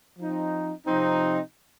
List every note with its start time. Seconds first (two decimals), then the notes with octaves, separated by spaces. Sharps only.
0.19 F3 C4 D#4
0.87 C3 F3 C4 D#4